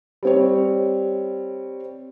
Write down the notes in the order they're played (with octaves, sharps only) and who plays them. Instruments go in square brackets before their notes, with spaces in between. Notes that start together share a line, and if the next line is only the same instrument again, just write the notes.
[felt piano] G3 C4 C#5